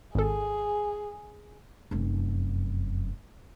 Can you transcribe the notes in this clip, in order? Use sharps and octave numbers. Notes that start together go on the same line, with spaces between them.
G#1 G#4 A4
F1 F#2